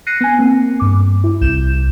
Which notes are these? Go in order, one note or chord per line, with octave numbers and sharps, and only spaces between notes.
F#6 A#6 C7 C#7 D#7
B3 G#5
A#3 C4
G2 D6
E4
C2 G6 E7